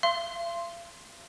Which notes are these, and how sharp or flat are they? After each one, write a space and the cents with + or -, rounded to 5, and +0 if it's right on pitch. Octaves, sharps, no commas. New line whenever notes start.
F5 -45 C6 +0